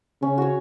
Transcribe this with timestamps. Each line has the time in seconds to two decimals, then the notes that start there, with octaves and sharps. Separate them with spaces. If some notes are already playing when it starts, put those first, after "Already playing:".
0.22 C#3 C#4
0.38 F#4 C#5